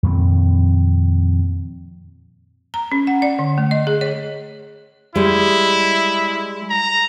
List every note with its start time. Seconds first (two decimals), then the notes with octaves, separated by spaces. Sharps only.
0.03 F2 A#2 D#3 C4
2.74 A#5
2.92 C#4
3.07 F#5
3.22 D5
3.39 D3
3.58 A3
3.71 D#5
3.87 G#4
4.01 C#5
5.16 G3 G#3 E4
6.70 A#5